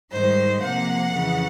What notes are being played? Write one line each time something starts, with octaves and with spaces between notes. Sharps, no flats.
G#2 D#3 G3 C5
C3 F3 A#3 F#5
F2 C#3 E3